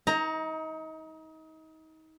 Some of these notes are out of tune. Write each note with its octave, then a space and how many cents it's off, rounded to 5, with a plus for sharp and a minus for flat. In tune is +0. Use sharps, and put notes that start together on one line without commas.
D#4 +30 A#5 +5